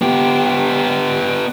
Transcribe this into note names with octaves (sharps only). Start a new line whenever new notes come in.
B3 G4